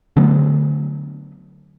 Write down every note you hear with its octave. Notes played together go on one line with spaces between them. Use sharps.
D3 F#3 A3 B3